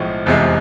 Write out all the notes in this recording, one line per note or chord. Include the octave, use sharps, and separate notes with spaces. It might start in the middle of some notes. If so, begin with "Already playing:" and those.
Already playing: B1 A2 F3 G#3
F1 E2 C3 G#3